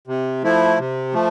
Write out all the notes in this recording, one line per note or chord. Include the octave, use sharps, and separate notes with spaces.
C3
F3 A3 E4
C3
F3 A3